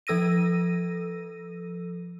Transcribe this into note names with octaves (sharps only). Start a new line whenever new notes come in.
F3 A4 E6 A#6 D#7